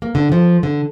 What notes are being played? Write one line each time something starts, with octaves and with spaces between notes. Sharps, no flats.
A#3
D3
F3
D3